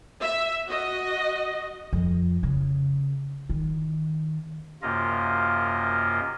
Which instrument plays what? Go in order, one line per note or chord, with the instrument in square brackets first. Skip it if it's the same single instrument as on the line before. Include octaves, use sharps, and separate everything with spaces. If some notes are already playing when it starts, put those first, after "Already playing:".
[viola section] E5
F#4 D#5
[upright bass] F2
C#3
D#3
[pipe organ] F#2 C3 A#3 F4 D#5